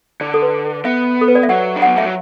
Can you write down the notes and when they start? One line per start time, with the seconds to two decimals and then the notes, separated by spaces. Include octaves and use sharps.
0.21 D3 D5
0.34 A4
0.42 B4
0.85 B3 E5
1.21 A4
1.28 B4
1.35 D5
1.43 E5
1.49 F#3 F#5
1.76 D4
1.82 F#5
1.85 B3
1.96 A3 E5
2.05 F#3